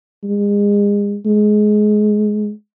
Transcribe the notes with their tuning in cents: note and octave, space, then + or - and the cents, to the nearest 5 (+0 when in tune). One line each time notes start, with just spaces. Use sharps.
G#3 -35
G#3 +20